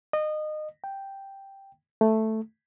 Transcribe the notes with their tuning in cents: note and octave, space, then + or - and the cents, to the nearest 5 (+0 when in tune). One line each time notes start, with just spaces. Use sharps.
D#5 -25
G5 +0
A3 +0